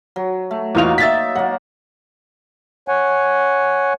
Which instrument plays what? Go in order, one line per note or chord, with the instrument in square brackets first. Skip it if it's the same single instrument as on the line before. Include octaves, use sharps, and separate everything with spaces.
[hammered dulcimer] F#3
A3
[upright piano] E2 F4 F7 [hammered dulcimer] A#3 D#4 F#4
[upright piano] E5 A6 B6
[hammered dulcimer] F#3 A#3 [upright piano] F#5
[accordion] C#5 F#5 G#5